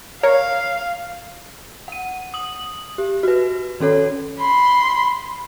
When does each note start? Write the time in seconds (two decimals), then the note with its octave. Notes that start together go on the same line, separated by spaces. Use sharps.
0.23 A#4 C#5 F5
1.88 F#5 D#7
2.34 D#6 F#7
2.98 G4
3.23 F#4 B4
3.80 D#3 C#4 A4 C#5
4.39 B5 C6